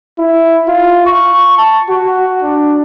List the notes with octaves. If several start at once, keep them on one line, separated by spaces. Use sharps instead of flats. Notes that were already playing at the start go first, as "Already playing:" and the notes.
E4
F4
C#6
A5
F#4
D4